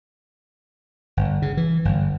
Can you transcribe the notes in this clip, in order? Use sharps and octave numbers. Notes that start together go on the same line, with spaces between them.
G1
C#3
E3
G1